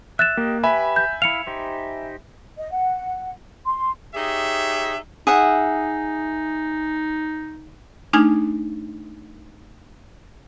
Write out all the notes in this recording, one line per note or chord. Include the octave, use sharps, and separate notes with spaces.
E5 F#6 A6 E7
A#3 G4 D#5
G4 B4 E5 G#5 B5
G6
E4 F5 C#7 F7
D#4 G4 C5
D#5
F#5
C6
D#4 G4 G#4 C#5 E5
D#4 G#4 E5 F#5
A3 D4 D#4 G#5 F6 G#6